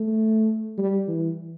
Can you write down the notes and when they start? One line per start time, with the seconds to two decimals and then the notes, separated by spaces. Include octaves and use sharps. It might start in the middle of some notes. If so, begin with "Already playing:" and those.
Already playing: A3
0.78 G3
1.08 E3